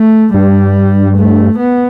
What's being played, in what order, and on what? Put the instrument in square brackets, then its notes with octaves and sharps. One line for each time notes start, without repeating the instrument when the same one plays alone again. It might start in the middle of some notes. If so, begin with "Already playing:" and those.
Already playing: [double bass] A3
[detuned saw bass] G2 [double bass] G3
[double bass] A3
B3